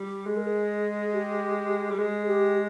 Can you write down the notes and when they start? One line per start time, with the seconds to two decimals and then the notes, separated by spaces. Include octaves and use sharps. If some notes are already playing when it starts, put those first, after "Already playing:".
Already playing: G3
0.27 G#3 G#4
0.37 A#4
0.47 G#4
1.13 G4
1.91 G3
1.98 G#3 G#4
2.27 G4